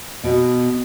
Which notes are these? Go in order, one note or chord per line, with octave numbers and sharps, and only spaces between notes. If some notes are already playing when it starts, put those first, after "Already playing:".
B2